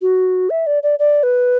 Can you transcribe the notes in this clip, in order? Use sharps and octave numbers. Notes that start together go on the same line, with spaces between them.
F#4
E5
D5
D5
D5
B4